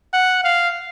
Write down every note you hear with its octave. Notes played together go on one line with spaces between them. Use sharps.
F#5
F5